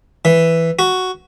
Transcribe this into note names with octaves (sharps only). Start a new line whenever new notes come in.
E3
F#4